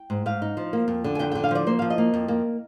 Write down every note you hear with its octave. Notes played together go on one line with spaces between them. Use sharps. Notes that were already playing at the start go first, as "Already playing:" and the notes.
Already playing: G5
G#2
G#2 F5
D#4
F3
A#3
F2
D3
G#5
F2 G5
D3 G5
F5
F3 D5
A#3 C5
F3 F5
D#5
A#3
F2
A#3